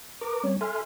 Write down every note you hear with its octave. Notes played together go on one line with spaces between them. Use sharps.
A#4 B4 A#5 D6
G3 C4 C#4 C#5
A4 E5 G#5 C6 F6